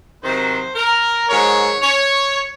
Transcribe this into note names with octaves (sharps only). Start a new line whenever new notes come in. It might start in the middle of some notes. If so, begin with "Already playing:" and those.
C3 D#3 F#3 C5
A#4
G#2 D#3 F#3 C#5
C#5